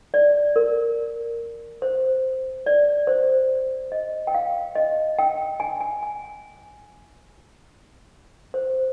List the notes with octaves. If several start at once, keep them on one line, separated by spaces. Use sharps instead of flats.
D5
A#4
C5
D5
C5
D#5
G5
F5
D#5
G5
G#5
G#5
G#5
C5